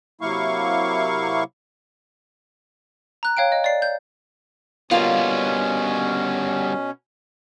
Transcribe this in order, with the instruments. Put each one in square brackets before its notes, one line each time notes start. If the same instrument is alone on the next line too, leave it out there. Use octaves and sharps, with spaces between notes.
[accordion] C3 F#3 A#3 E4 F5 C#6
[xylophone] A#5 F#6
C#5 F5 G5 D7
D#5
D5 C7
G6
[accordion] B2 C#4 [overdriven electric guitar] G3 B3 [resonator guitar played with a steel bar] A#3 F4